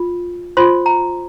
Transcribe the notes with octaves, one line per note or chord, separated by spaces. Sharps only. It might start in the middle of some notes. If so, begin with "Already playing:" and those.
Already playing: F4
F4 C5 C6
A#5